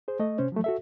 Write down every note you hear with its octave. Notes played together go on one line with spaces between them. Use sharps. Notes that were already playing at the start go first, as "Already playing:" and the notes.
G#4 C5
A3 D#5
C3 C#4 C5
F3 F#3 A3
F#4 A4 E5